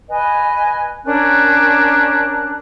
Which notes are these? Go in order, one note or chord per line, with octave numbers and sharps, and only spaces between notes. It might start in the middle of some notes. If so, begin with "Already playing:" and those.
B4 D#5 G#5
C#4 D4 A#4 F#6